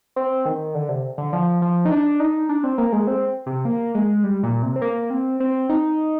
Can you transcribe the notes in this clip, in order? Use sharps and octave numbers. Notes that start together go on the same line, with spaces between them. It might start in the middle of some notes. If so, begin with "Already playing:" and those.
C4
D#3
D3
C3
D3
F3
F3
D#4
D4
D#4
D4
C4
A#3
G#3
C4
C3
A#3
G#3
G3
A#2
C3
C4
A#3
C4
C4
D#4